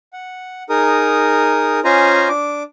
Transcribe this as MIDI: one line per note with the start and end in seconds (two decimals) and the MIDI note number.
0.13 0.63 78
0.70 1.80 63
0.70 1.80 68
0.70 1.80 70
0.70 1.80 87
1.85 2.28 61
1.85 2.28 65
1.85 2.28 72
1.85 2.28 75
1.85 2.28 80
1.85 2.28 82
2.29 2.63 62
2.29 2.63 86